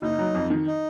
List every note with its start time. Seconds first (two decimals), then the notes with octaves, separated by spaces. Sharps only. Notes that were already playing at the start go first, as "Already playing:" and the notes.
0.02 F#1 D#4
0.19 F#3
0.35 F2
0.50 D#3
0.67 D#4